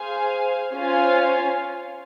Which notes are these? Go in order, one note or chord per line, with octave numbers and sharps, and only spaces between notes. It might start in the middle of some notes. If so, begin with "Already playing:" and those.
Already playing: G#4 C5 F5 G#5
C#4 F4 C5 F5 G#5